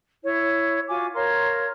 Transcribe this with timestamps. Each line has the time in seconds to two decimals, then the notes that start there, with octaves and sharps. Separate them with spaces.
0.22 E4 C#5
0.87 F4 F#4 G#5 D6
1.15 A#4 C#5 F5 C6